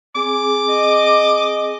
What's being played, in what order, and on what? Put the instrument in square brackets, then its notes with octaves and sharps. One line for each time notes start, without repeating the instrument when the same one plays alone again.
[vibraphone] C4 G#4 G#5 [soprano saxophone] D6
[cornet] D#5